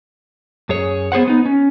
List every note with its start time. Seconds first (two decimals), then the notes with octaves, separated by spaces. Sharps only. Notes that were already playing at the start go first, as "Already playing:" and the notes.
0.69 F#2 G#4 C#5
1.12 B3 G#4 C5 F#5
1.28 B3 D#4
1.45 C#4